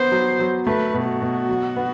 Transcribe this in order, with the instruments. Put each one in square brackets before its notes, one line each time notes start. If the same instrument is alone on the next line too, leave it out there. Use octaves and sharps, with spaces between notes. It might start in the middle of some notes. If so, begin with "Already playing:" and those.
Already playing: [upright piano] B3 [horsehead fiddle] C5
[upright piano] F#3
F#3
[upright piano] A3 [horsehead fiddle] B4
[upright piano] B2
[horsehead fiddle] F#4
[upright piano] B2
F#3
B3